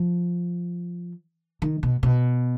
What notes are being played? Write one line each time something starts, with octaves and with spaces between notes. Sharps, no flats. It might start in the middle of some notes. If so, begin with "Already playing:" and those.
Already playing: F3
D#3
B2
B2